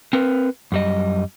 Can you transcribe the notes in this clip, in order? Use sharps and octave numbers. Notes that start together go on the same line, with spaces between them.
C4 A#4 B4
F#2 G3 D#5